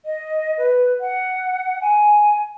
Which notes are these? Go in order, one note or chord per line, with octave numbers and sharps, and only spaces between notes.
D#5
B4
F#5
G#5